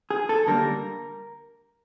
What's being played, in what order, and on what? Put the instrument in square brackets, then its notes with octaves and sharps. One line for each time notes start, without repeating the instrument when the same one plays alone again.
[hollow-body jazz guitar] G#4
A4
D3 G3 A#3 A#4